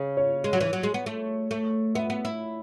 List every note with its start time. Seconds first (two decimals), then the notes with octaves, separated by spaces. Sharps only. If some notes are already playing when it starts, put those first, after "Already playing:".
Already playing: C#3 G#4
0.17 C#5
0.44 G#3
0.53 F#3
0.60 E3 C#5
0.73 F#3
0.83 G#3
0.94 B3
1.06 A3
1.51 A3
1.95 B3 E5
2.10 B3
2.25 E4